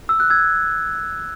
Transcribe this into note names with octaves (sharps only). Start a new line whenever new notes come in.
E6
F#6
E6 G#6